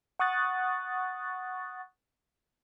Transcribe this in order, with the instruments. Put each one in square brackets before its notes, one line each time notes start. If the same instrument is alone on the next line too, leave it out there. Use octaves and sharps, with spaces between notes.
[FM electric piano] F#5 C#6 D#6 F#6 A6